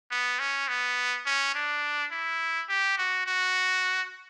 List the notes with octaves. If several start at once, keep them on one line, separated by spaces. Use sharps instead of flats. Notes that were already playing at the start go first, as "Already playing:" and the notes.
B3
C#4
B3
C#4
D4
E4
G4
F#4
F#4